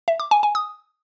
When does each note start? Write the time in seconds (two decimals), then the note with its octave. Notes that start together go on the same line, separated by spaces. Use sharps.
0.08 E5
0.20 D6
0.31 G#5
0.43 G#5
0.55 D#6